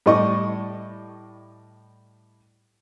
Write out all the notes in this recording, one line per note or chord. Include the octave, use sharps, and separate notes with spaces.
A2 G3 D5 D#5 C#6